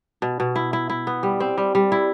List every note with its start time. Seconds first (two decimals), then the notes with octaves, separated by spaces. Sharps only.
0.22 B2
0.40 B2
0.56 E4
0.73 E4
0.90 E4
1.07 B3
1.23 G3
1.40 C4
1.58 G3
1.75 G3
1.92 E4